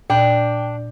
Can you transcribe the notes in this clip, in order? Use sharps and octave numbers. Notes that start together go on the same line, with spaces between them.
A#2 D4 G5